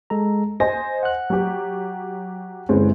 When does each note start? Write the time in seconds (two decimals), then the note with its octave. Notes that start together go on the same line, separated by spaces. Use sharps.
0.10 G#3 A4 A#5
0.60 C5 D#5 G#5 A#6
1.03 F#5 F#6
1.30 F#3 G4
2.69 G1 G#3 C4 C#4 E4